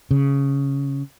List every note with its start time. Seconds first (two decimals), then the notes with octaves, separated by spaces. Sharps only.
0.11 C#3